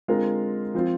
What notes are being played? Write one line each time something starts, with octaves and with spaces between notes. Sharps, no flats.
D3 G#3 C4 F4 A#4
F3 C4 F4